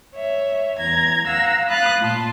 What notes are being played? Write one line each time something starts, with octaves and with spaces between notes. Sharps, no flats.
C#5 E5
E2 A#5 G#6
F5 F#5 A#5 E6
F5 B5 D#6 F#6 A6
A#2 F4 A5